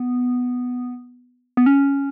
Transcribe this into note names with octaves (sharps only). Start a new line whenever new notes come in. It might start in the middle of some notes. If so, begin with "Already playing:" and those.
Already playing: B3
B3
C#4